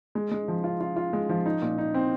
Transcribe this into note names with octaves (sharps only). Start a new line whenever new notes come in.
G#3
G#3
F3
F4
F4
F4
G#3
F3
D#4
A#2
D#4
C4